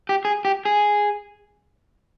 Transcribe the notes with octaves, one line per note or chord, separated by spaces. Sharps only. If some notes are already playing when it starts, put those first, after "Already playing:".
G4
G#4
G4
G#4